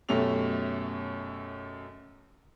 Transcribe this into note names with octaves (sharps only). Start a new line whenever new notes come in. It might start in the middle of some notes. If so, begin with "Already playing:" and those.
F#2 B2 A3 C#4 G4 F7